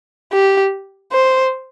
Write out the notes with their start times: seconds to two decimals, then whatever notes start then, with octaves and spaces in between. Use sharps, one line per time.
0.33 G4
1.12 C5